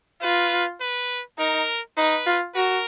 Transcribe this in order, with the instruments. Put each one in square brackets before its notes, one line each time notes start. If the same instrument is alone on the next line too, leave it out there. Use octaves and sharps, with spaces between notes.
[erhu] F4 [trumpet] B4
[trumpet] B4
[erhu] D#4 [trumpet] A#4
[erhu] D#4 [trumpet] B4
[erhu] F4
[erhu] F#4 [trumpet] A#4